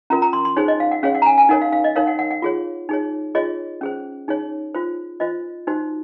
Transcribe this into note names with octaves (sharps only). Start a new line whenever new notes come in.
C#4 F4 A#4 A#5
A#5
C6
C6
D#4 G#4 C5 C#5
D#5
F5
F#5
C#4 G#4 C#5 F5
F#5
A#5
G#5
G#5
D#4 A#4 C#5 F#5
F5
F5
D#5
D#4 A#4 C#5 F5
F#5
F#5
F#5
F4 G#4 C#5
D#4 G#4 C#5
F4 G#4 C#5 D#5
C#4 G#4 C5
D#4 G#4 C#5
F4 C5
F4 C5 D#5
D#4 F#4 C5